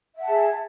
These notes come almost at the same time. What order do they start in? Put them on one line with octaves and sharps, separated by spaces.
E5 F#5 A5 G#4